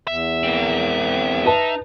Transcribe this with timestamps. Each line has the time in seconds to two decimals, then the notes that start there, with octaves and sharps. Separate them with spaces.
0.07 E2 E5
0.43 A#3 C4
1.46 D#4 B4 A5